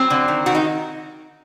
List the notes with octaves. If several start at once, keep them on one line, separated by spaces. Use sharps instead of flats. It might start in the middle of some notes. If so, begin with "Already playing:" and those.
Already playing: F#3 C4
D3
D#3
D#3 F#4
D#4